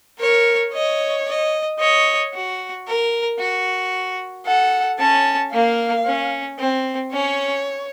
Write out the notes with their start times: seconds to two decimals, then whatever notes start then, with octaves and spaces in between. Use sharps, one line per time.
0.20 A#4 C#5
0.73 C#5 D#5
1.27 D#5
1.80 C#5 D#5
2.34 F#4
2.87 A#4
3.39 F#4
4.46 A4 F#5
4.99 C#4 A5
5.53 A#3 F5
6.06 C#4
6.59 C4
7.13 C#4 C#5